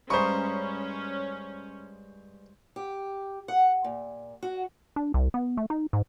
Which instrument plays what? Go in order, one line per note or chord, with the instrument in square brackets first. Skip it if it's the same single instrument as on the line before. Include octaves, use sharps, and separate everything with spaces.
[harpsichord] G2 G#3 [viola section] C#4 [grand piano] C5 C#6 [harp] A#5 B5 D#6
[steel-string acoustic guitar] G4
F#5
A#2
F#4
[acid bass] D4
C2
B3
A3
D#4
G#2